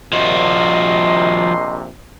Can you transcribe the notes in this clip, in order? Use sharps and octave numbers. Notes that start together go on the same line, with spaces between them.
A#1 C3 F3 F#4 D#5 C6